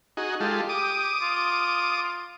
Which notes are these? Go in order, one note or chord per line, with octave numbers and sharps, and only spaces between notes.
D#4 F#4 G#4
G#3 F4 G4 A4
D6 D#6
F4